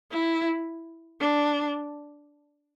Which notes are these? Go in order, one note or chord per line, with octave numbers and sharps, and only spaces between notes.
E4
D4